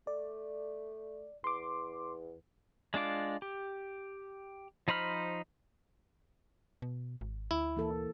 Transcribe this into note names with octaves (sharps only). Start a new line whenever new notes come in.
A3 D5
E2 C6 D6
G#3 D4 F4 D6
G4
F3 D#4 C5 B5 F6
B2
G#1
D2 E4
E3 A#3 A4